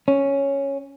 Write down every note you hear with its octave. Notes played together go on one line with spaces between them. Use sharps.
C#4